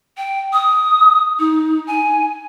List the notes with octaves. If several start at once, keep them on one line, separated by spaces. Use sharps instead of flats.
G5
D#6
D#4
G#5